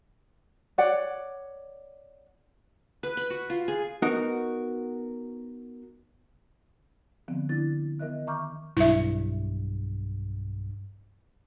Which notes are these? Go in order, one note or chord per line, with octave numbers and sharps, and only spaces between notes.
C#5 D5 F#5
B4
B5
F#4
F4
G#4
B3 D#4 F#4 A#4
D3 F3 B3 C4
D3 D4 E4 A6
D#3 B3 A#4 D#5 E5 F#6
E5 A#5 C#6 D6 F6 G6
B1 G2 E4 E5